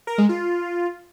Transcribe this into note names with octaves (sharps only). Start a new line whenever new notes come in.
A#4
G#3
F4